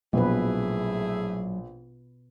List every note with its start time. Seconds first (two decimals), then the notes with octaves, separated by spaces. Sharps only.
0.13 A#1 B2 F#3 A3 E4 G#4 B4